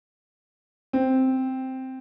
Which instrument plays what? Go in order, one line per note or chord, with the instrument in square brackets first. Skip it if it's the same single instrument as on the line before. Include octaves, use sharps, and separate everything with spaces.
[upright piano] C4